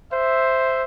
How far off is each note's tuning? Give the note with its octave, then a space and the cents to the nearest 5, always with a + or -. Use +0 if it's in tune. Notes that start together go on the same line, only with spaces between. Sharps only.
C5 +0 E5 +0